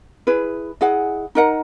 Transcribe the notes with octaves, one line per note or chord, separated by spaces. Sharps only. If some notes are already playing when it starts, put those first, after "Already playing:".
E4 G#4 B4
E4 G#4 D#5 F#5
D#4 A#4 D#5 F#5